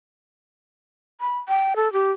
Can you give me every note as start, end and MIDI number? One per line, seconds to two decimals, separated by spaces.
1.21 1.38 83
1.49 1.74 79
1.76 1.91 69
1.93 2.11 67